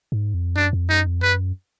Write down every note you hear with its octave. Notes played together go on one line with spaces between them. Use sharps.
G#2
F2
F#2 D4
F2
F#2 D#4
F2
F#2 B4